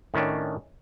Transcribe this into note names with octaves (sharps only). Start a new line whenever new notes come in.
A2 D#3 C#4 D4